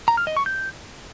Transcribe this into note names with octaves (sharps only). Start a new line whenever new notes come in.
A#5
F6
D#5
C#6
G6